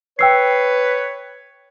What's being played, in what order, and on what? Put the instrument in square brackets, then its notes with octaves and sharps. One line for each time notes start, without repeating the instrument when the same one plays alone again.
[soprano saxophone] B4 [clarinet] C#5 [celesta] G5 E6 C7